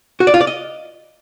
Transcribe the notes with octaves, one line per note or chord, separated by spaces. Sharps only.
F#4
D5
F4
D5
D#5